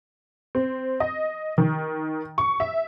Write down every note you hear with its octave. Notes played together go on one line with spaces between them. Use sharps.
C4
D#5
D#3
C#6
E5